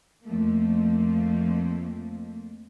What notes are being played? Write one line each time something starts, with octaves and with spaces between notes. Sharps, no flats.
F2 F3 A3 A#3